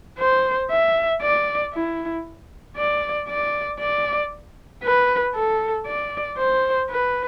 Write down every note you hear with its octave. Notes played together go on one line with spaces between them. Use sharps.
C5
E5
D5
E4
D5
D5
D5
B4
A4
D5
C5
B4